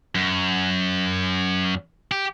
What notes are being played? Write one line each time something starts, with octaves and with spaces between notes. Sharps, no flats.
F#2
G4